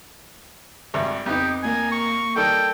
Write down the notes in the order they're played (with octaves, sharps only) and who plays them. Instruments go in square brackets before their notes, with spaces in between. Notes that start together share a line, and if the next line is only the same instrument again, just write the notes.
[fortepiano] G#1 G2 A3
[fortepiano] F2 B3 D#4 [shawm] G4
[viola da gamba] A#3 [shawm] G#5
[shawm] C#6
[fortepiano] D#3 G3 [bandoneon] A4 [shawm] G5